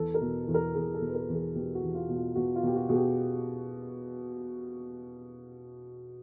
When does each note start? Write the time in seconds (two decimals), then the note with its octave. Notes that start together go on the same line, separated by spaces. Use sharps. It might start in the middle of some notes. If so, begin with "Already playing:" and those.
Already playing: E2 A4
0.14 A#4
0.21 B2
0.44 E2 A4
0.54 A#4
0.75 E2 G#4
0.94 A4
1.01 B2
1.08 B4
1.14 A#4
1.28 E2
1.35 G#4
1.55 B2 G4
1.75 F#4
1.82 E2
1.95 F4
2.09 B2
2.16 F4
2.35 B2 F#4
2.56 F4
2.63 B2 G4
2.76 F#4
2.89 B2 G#4
2.95 G4